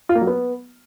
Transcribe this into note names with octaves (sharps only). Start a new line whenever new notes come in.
F4
A#3
F#3
B3